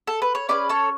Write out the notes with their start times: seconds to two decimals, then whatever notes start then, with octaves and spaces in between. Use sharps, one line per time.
0.07 A4
0.22 B4
0.35 C#5
0.49 C#4 E4 G#4 B4 D5
0.69 A4 C#5